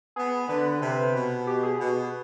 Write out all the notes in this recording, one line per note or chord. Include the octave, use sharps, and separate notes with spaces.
B3 G#4
D3 B4
C3 B4
B2
G4
G#4
B2